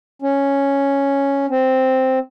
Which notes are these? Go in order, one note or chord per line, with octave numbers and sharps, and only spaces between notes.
C#4
C4